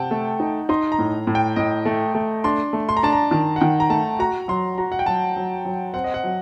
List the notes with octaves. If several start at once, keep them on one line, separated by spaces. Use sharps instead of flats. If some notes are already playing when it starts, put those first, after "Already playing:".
Already playing: C3 F#5 G5 A5
A3
D#4
D#4 C6
A#5
A2
A2
G5
A2 D#5
A3
A3
D4 C6
A3
C6
A#5
D4 A5
A#5
D#3 A5
F#5
D#3 G5
A#5
A3 A5
F#4 A#5
F#3 C6
F#4 A#5
F#5
G5
F#3 A5
F#3
F#3
C4 F#5
D#5
F#5
F#3